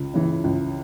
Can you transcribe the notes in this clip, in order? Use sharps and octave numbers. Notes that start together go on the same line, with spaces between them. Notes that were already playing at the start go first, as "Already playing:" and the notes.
Already playing: C#2
C#3 E3
C#2